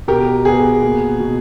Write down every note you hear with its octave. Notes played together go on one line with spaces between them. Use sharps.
B2 G4 A#4
B3 G#4
A#3
B2